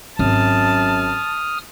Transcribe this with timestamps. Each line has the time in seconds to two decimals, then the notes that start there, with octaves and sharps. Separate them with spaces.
0.19 G#1 F#2 A5 D#6 F6